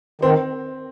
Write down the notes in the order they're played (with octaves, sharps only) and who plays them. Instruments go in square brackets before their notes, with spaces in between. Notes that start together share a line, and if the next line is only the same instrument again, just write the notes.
[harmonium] D#3 [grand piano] C4